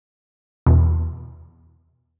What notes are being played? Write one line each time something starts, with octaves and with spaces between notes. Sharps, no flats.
E2 B2